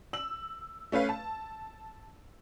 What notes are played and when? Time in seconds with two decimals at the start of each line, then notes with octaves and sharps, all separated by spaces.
0.13 E6 F#7
0.92 A3 C#4 B4 F5
1.09 A5